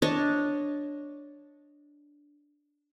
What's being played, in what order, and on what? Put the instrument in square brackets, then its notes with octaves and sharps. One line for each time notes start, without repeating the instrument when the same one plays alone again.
[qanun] D4 C#5 D#5 A5